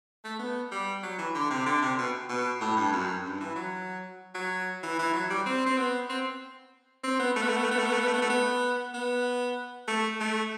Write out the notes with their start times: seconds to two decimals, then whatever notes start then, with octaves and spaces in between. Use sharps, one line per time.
0.24 A3
0.39 B3
0.71 G3
1.03 F#3
1.18 E3
1.34 D3
1.50 C3
1.66 D3
1.82 C3
1.98 B2
2.29 B2
2.61 A2
2.77 G2
2.93 F#2
3.24 G2
3.40 E3
3.55 F#3
4.35 F#3
4.83 E3
4.99 E3
5.13 F#3
5.30 G3
5.46 C4
5.66 C4
5.78 B3
6.09 C4
7.03 C4
7.20 B3
7.36 A3
7.42 B3
7.49 A3
7.57 B3
7.64 A3
7.71 B3
7.78 A3
7.85 B3
7.93 A3
8.00 B3
8.07 A3
8.13 B3
8.22 A3
8.30 B3
8.94 B3
9.88 A3
10.20 A3